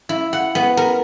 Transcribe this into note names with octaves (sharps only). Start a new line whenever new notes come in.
E4
F#5
B3
A#4